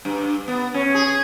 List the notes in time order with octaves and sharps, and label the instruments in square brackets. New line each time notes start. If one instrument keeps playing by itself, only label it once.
[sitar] G2
B3
C#4
G#4